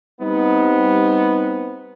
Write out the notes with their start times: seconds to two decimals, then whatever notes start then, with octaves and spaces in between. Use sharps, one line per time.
0.21 G3 B3 C4 D#4